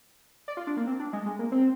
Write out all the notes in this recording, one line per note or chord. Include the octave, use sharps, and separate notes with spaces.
D5
F4
D4
A#3
C4
D4
G#3
G#3
A#3
C4